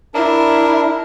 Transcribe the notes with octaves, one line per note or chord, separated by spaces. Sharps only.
D4 E4 A#4